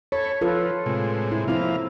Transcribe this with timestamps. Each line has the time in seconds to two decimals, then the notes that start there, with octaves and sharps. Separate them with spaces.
0.12 A4 C#5 B5 C#6
0.41 F3 F4 A4 B4
0.86 A2 C3 G#3
1.32 E4
1.48 F3 A#3 C4 E4 F5